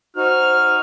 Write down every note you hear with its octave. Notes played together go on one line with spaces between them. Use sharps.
D#4 F#4 C5 F6